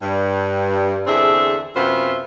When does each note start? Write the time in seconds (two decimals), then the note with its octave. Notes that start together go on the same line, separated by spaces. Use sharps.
0.02 G2
1.07 E2 D3 C4 D4 G#4 E5
1.75 F#2 C3 B3 F4 C5 E5